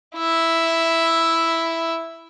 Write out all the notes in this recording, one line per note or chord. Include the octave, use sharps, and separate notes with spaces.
E4 E5